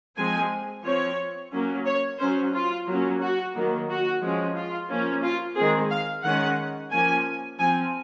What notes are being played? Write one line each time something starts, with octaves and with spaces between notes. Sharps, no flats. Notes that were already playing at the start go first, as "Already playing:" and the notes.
F3 G#3 C4 G#5
F3 C4 C#5
F#3 A#3 C#4
C#5
F#3 C#4 C5
F4
F#3 A#3 C#4
F#4
D#3 F#3 A#3
F#4
F3 G#3 C#4
F4
F3 A#3 C#4
F4
D#3 G#3 C4 G#4
F5
D#3 G#3 C#4 F#5
F3 A#3 C#4 G#5
F3 C4 G#5